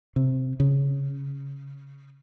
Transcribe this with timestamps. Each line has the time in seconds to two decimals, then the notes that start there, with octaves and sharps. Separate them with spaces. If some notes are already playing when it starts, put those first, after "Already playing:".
0.16 C3
0.60 C#3